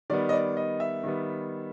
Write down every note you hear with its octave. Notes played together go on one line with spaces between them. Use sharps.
D#3 G3 B3 D5
D#5
D5
D#5
E5
D#3 G3 B3